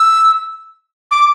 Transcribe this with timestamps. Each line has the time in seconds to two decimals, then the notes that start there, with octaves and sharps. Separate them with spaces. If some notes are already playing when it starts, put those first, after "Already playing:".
Already playing: E6
1.11 D6